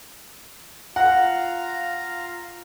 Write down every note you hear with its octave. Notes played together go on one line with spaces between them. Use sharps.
F4 F5 F#5 A#5